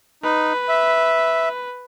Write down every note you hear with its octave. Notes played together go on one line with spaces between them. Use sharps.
D#4 B4
E5